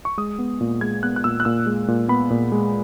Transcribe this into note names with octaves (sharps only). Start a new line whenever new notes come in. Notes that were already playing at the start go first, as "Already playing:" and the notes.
C#6
G#3 D#6
B3
A#2
G#3 G#6
B3 F#6
F#6
A#2 E6
F#6
A#2 E6
G#3
A#2
B3 B5
A#2
G#3